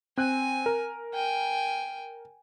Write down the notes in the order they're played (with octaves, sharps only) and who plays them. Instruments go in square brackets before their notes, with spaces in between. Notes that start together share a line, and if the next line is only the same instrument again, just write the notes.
[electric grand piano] C4 F#6 [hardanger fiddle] G#5
[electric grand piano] A#4
[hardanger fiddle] G5 G#5